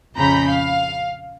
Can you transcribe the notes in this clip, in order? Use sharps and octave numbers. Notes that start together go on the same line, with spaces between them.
A#1 F2 C#3 A#5 B5 G6
F5